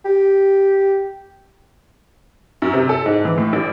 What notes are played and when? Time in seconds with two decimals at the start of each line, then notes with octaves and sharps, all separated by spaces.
0.05 G4
2.62 F#2
2.74 C3
2.89 A4
3.06 G#2
3.25 E3
3.38 A2
3.53 A1